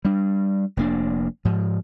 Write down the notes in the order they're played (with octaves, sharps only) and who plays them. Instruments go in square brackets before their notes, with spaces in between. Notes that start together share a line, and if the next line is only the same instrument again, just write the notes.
[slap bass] G3 D4
F1 A#3 D4
G#2 F3